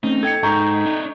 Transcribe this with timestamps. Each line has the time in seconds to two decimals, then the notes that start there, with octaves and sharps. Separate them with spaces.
0.03 A3 C4 C#4 D#4
0.23 A4 G5 G#6 C#7
0.43 G#2 D#4 A#5 C#6 G6
0.85 D4 D#5